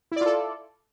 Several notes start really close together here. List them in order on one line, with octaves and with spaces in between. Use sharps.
E4 D5 F4 A4